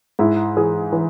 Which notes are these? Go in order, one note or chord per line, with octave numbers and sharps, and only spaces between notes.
G#2 E4
E3 G#4
E3